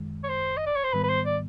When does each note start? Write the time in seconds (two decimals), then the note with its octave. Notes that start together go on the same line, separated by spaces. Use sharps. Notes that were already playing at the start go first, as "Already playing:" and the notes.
Already playing: F#2 D#3 G#3
0.23 C#5
0.29 C5
0.57 D#5
0.66 D5
0.76 C#5
0.84 C5
0.93 G#2 D#3 G3 B3 B4
1.04 B4
1.09 C5
1.26 D5